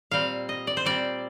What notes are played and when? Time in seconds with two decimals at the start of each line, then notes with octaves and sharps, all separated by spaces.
0.11 A#2 G3 C4 F5
0.49 D#5
0.67 D5
0.77 C5
0.85 A#2 G3 C4 D5